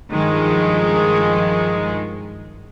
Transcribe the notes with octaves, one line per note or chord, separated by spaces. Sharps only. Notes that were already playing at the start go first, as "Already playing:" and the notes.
G2 D#3 F3 G#3